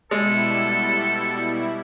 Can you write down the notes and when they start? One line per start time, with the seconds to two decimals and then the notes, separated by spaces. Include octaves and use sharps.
0.11 B2 G3 G#3 E4 A4